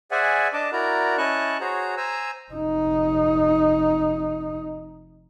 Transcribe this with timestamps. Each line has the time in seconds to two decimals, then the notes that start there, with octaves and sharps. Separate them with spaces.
0.11 G#4 C5 D5 E5 F#5 G#5
0.53 D4 D#5 A5 D6
0.72 E4 F#4 A#4 D5 A#5
1.18 C#4 E4 D#5 A5 C#6 F#6
1.60 F#4 G#4 C5 C#5 A#5
1.97 C5 G#5 A#5 E6
2.51 F1 D#4